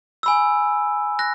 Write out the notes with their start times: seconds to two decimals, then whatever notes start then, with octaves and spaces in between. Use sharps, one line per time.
0.23 G#5 B5 E6
1.19 F#6 A#6